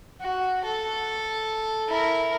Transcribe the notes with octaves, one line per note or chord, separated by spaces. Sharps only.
F#4
A4
E4 A#4